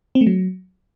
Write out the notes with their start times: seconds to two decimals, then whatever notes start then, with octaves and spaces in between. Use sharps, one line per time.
0.15 C4
0.21 A3
0.27 F#3